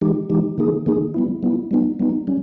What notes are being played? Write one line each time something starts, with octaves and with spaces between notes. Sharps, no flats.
E3 G#3 D#4 G4
E3 G#3 D#4 G4
D#3 A#3 D#4 G#4
D#3 A#3 D#4 G#4
G3 B3 E4
G3 B3 E4
G3 B3 D#4
G3 B3 D#4
G3 C#4